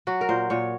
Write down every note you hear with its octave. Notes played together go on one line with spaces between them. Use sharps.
F#3 F#4
A#4
A#2 C5
A#2 C#5